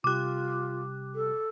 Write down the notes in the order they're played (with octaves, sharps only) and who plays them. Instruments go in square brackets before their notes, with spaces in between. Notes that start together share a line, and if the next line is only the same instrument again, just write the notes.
[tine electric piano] C3 G3 G4 [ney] F4 [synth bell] D6 F#6
[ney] A4